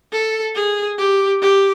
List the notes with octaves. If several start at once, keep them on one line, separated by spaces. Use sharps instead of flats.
A4
G#4
G4
G4